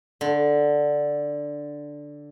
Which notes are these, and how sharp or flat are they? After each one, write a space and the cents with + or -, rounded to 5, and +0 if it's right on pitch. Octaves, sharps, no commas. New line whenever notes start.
D3 +0 C6 +40